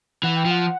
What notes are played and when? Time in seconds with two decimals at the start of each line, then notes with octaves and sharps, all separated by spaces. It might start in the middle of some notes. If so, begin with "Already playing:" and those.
0.23 E3 F#5
0.36 G5
0.45 F3
0.51 F#5